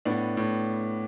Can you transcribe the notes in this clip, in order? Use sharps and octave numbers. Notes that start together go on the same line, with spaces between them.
A2 B3 D4
A2